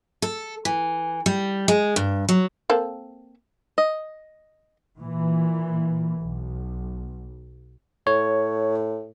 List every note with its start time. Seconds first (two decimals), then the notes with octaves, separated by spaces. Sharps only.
0.22 A4
0.65 E3
1.26 G3
1.68 G#3
1.96 G2
2.29 F#3
2.70 A#3 C4 A4
3.78 D#5
4.99 A#2 E3
6.20 B1
8.07 A2 C#5